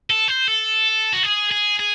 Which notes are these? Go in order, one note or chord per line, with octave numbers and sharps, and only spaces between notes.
A4
C5
A4
F#4
G#4
G#4
G#4